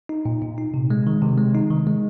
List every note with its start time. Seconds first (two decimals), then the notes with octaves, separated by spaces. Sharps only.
0.09 D#4
0.25 A#2
0.42 A#2
0.58 D#4
0.74 C3
0.90 G#3
1.07 D#3
1.22 C3
1.38 G#3
1.55 D#4
1.70 D#3
1.87 G#3